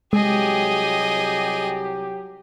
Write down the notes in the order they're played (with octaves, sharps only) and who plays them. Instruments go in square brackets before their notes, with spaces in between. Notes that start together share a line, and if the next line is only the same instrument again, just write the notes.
[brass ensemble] C2 F#3 G4 [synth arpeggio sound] G#3 [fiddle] G#4 D#5